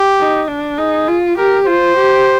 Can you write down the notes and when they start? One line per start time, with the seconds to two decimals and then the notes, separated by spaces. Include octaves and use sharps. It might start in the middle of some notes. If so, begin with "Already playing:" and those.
Already playing: G4
0.20 D#4
0.48 D4
0.78 D#4 G#4
1.08 F4
1.38 G4 A#4
1.66 F4 C5
1.96 G4